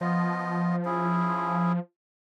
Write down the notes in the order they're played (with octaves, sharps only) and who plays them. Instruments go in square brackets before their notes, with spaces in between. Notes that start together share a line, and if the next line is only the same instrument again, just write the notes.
[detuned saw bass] F3 [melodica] B3 F4 D#5
[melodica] C#4 E4 G#4